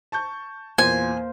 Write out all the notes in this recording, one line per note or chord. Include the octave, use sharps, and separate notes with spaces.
A5 C#6 G6
E2 A#2 A#3 C5 G#5